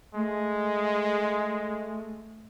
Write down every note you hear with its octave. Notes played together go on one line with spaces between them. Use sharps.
G#3 A3